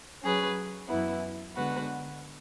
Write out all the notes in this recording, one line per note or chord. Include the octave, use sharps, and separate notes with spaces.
F#3 C#4 G#4 B4
F#2 E3 B3 E4
D3 G#3 B3 F#4 B4